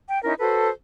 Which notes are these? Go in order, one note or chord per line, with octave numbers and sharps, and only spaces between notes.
G5
C#4 D#4 E4 A#4
F#4 A4 B4 C5